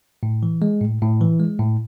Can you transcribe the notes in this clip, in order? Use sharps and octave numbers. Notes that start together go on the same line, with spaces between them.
A2
E3
G#3
A2
A2
E3
G#3
A2